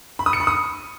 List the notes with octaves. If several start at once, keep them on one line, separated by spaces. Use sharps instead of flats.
B5
D#6
C#7
B5
D#6